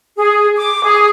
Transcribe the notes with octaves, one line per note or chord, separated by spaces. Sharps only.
G#4
D6
G#4